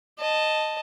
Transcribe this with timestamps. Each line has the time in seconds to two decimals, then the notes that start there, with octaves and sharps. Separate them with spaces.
0.19 D#5 A5